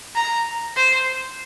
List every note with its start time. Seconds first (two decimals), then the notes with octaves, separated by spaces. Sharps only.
0.15 A#5
0.76 C5